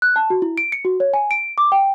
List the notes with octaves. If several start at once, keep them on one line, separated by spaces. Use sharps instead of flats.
F#6
A5
F#4
E4
D7
C#7
F#4
C#5
G#5
D7
D6
G5